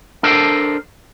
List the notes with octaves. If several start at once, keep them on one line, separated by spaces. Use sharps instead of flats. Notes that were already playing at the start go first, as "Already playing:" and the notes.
D4 A4 A#4 C5